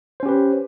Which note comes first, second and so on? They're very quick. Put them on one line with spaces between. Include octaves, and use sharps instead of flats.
C5 C#4 G4 B4